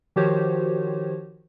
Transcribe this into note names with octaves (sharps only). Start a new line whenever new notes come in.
D#3 F3 F#4 G4 C5 C#5